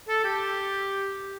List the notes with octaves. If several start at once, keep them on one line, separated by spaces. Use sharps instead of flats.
A4
G4